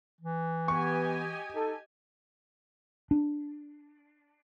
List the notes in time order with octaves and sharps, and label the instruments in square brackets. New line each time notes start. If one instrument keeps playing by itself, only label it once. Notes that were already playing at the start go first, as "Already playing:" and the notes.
[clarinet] E3
[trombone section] B3 [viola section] G4 D#5 G#5 [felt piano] C#6
[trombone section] D#4 A4
[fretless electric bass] D4